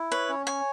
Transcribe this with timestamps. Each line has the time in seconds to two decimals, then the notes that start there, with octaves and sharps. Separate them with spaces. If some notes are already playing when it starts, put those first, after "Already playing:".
Already playing: E4
0.12 B4 C#5
0.29 C#4
0.46 C#5 G#5